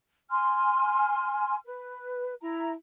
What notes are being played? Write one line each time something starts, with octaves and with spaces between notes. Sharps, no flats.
G#5 C6 F6
B4
E4 A#5